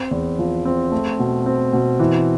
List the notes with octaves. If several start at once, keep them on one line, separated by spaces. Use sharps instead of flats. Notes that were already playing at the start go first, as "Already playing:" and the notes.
Already playing: C4
E2
F3
C4
A3
B2
C4
B2
E3